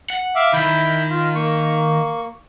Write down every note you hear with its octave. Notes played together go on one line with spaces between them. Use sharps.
F#5
E5 F5 D6
D#3 E4 B5 G6
F4
A#3 C#6